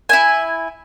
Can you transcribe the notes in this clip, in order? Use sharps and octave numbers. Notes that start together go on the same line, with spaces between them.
E4 E5 G#5